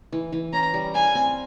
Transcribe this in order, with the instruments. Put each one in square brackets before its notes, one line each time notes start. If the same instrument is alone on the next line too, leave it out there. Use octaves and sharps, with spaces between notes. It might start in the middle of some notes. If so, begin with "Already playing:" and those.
[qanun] E3
E3
[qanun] C#4 [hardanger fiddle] A#5
[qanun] G3
[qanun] F5 [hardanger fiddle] G#5
[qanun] C4